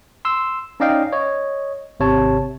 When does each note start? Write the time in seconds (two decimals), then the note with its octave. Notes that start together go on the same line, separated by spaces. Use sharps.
0.25 C6 E6
0.80 C#4 D#4 D5 D#5 F5 G5
1.13 C#5 D#5
2.00 G#1 C3 C#5 A5